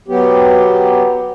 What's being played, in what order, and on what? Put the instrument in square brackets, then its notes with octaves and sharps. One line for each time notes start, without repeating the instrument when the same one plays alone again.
[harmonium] F#3 B3 G4